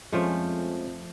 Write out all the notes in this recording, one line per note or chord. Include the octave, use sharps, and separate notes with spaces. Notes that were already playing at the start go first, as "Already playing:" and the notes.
F2 F3 G#3 A3 C#4 C5